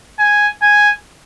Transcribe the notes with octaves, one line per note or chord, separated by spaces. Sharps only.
G#5
G#5